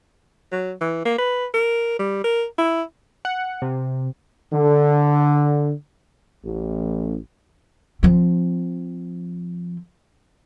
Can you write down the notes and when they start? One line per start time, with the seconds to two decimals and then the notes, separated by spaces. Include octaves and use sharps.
0.52 F#3
0.81 E3
1.05 A#3
1.19 B4
1.54 A#4
1.99 G3
2.24 A#4
2.58 E4
3.25 F#5
3.62 C3
4.53 D3
6.45 A1
8.03 F3 C4